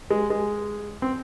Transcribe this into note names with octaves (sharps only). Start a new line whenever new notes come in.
G#3
G#3
C4